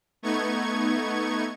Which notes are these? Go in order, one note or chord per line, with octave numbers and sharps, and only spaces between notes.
A3 B3 D#4 C#6 G#6